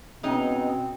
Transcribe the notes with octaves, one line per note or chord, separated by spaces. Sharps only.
B2 G#3 C4 C#4 D#4